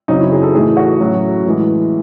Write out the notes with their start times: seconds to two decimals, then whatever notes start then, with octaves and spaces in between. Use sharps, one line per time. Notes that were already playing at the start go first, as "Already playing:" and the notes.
0.08 F#2 C#3 F#3 C4 D#4
0.20 E4
0.32 G#4
0.43 A4
0.54 A2 E3 A3 D#4 G#4
0.77 F#4
1.00 A2 F#3 C#4
1.45 A2 E3 G#3